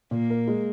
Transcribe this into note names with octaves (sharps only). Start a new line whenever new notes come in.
A#2 A#3
A#4
G#3